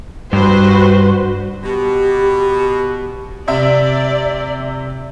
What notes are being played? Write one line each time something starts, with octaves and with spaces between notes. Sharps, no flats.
G2 F#4 B4 C5
B2 G4
C3 D5 E5